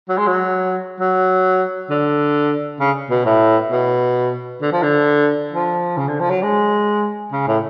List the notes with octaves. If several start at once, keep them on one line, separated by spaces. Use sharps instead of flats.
F#3
G#3
F#3
F#3
D3
C#3
B2
A2
B2
D3
F3
D3
F3
C#3
D3
F3
F#3
G#3
C#3
A2